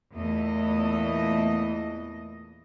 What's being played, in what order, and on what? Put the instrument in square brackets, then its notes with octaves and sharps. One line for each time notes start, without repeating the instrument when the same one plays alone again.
[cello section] E2 A#2 E3 A3 D#5